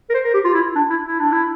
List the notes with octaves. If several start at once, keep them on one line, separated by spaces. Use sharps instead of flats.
A#4
C5
A#4
G4
F4
E4
D4
E4
E4
D4
E4